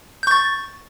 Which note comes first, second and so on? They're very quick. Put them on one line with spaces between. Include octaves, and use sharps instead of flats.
G6 C#6 A6